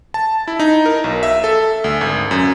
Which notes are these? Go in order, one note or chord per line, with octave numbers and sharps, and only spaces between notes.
A5
E4
D#4
A#4
B1
E5
A4
D2
G#1
F#2